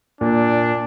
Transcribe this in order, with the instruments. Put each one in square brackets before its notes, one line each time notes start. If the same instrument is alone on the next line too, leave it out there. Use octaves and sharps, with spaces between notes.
[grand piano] A#2 [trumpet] D4